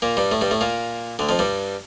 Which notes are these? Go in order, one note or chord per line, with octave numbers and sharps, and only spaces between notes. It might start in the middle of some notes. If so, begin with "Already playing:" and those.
A#2 A#3
G2 G3
A2 A3
G2 G3
A2 A3
A#2 A#3
D2 D3
F2 F3
G2 G3